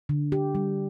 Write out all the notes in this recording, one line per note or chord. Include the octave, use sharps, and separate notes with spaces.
D3
G4
G3